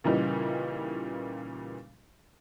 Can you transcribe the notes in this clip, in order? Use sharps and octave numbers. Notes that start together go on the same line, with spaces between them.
A#2 C#3 E3 G3 D#4